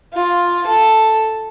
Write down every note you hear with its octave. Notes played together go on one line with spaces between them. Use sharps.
F4
A4